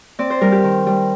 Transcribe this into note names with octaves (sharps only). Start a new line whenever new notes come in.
C4 D5
C5
G3 A#4
G4
D#3
G3